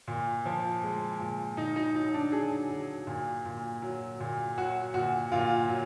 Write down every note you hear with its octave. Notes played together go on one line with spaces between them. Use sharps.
A#2
F3
G#3
A#2
A#2 D#4
D#4
F#3 D#4
D4
F#3 G#4
F#3
A#2
A#2
F#3
A#2
F#3 F#4
A#2 F#4
A#2 F4
F#3